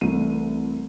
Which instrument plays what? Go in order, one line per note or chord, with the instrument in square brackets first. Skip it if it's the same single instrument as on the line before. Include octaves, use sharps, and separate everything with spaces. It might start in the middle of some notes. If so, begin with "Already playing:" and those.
[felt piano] C2 E3 A3 D#7